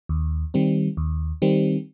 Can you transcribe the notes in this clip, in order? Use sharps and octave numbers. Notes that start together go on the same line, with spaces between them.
D#2
D#3 G3 C4
D#2
D#3 G3 C4